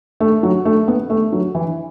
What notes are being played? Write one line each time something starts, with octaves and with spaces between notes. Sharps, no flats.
A3
F#3
A3
B3
A3
F#3
E3